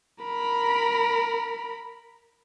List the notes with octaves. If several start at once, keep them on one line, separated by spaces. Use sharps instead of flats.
A#4 B5